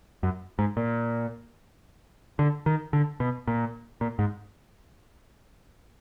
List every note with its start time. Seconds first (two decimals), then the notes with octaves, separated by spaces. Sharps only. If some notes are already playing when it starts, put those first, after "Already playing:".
0.23 F#2
0.59 G#2
0.77 A#2
2.39 D3
2.66 D#3
2.93 D3
3.20 B2
3.48 A#2
4.01 A#2
4.19 G#2